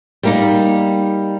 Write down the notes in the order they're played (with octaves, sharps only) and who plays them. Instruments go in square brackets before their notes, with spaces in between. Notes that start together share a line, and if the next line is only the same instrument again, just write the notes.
[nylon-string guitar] G3 A#3 D#4